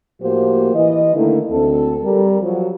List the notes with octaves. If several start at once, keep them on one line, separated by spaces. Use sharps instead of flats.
A2 F3 A#3 F#4 G4 C5
E3 D#5
D3 D#3 A3 A#3 E4
D2 C4 A4
G3 A4 A#4
F3 F#3